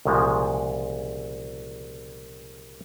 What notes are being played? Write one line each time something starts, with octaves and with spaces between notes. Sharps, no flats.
C2 A#2 C#3 F3 G#3